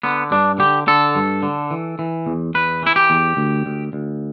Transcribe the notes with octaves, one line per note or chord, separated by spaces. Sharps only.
D3 B3
G2 D4
D3 G4
D3 A4
G2
D3
E3
E3
E2
E2 B4
E3 E4
G4
E2
D2
D2
D2